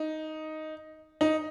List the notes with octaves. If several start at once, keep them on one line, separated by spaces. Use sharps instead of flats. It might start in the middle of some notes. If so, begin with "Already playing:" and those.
Already playing: D#4
D#4